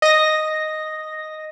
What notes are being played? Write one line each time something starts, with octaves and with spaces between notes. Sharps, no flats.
D#5 A#6